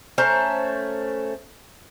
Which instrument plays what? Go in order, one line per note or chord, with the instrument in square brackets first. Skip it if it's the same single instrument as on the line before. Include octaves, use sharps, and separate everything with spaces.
[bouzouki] A3 C#4 C5 A#5